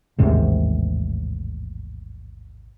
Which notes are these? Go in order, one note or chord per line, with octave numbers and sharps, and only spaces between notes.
A1 D#2 G#2 C3